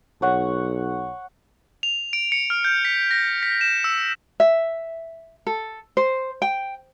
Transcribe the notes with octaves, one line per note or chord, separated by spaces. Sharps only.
B1 C#5 F#5
F7
D7
C#7
F6
G6
B6
A#6
B6
E7
E6
E5
A4
C5
G5